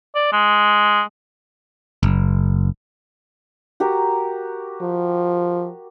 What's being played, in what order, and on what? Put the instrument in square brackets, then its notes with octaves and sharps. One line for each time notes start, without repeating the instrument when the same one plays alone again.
[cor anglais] D5
G#3
[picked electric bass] F#1
[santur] F#4 G4 A#4
[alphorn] F3